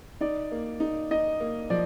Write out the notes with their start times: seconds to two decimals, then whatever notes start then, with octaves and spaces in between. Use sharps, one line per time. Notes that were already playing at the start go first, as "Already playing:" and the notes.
0.21 D#4 D5
0.51 A#3
0.80 D#4
1.11 D#4 D#5
1.40 A#3
1.70 F3 D5